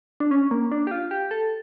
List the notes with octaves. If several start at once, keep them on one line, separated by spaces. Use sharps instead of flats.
D4
C#4
A#3
D4
G4
F4
G4
A4